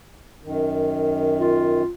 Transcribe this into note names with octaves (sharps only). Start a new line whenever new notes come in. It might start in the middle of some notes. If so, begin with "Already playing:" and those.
F#2 D#3
F4